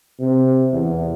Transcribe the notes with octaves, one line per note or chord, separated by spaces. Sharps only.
C3
E2